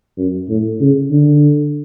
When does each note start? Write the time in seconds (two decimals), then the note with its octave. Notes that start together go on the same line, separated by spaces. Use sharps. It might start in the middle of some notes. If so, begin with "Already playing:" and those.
0.17 F#2
0.49 A2
0.80 C#3
1.11 D3